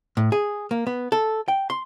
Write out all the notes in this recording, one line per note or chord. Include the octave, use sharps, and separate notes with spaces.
A2
G#4
A#3
B3
A4
G5
C6